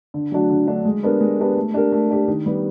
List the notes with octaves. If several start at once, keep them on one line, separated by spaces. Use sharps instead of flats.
D3
F#3 A3 D4 F#4
D3
F#3 A3 D4 F#4
G#3
B3 D4 G4 A#4
G#3
B3 D4 G4 A#4
A3
D4 G4 A#4
A3
D4 G4 A#4
D#3
G3 B3